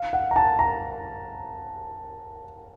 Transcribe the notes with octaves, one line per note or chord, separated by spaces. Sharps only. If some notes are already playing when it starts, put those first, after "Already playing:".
Already playing: F5
F#5
A#5
A5
A#5